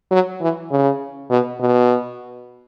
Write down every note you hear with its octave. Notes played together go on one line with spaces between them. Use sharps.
F#3
E3
C#3
B2
B2